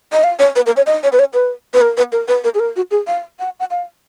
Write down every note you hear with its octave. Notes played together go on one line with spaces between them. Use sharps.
D#5
F5
C#5
B4
A#4
C#5
D#5
C#5
B4
C#5
B4
B4
A#4
B4
A#4
B4
A#4
G#4
A#4
F#4
G#4
F5
F#5
F#5
F5